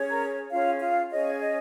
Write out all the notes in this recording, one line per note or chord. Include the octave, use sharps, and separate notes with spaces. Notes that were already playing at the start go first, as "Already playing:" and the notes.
Already playing: C#4 G#4 C#5
A#4 A#5
C#4 F4 G#4 C#5 F5
F4 F5
C#4 G#4 C#5 D#5
D#5